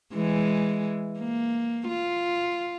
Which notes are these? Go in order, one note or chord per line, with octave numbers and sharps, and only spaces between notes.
E3 G#3
A#3
F4